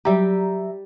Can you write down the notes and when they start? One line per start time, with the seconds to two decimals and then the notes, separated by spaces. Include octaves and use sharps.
0.05 F#3 G3 G4 E5 A#5